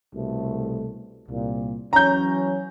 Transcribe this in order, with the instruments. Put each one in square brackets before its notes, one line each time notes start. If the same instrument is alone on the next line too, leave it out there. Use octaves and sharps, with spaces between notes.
[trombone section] C2 B2 A3
C2 A#2
[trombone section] E3 F#3 C#4 [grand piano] A#5 G6